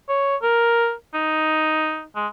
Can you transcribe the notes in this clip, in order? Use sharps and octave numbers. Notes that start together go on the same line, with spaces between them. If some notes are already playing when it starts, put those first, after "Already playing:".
C#5
A#4
D#4
G#3